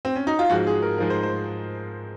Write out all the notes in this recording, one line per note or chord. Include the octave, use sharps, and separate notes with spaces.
C4
C#4
D#4
F4
G#2 F3 G#3 F#4
G#4
A#4
G#2 F3 G#3 A#4
C5
C5